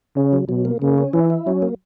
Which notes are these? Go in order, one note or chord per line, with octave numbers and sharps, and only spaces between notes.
C#3 C#4
F#3
B2 F#3
A#3
C#3 A#3
C#4
E3 E4
E4
F#3 C#4
A#3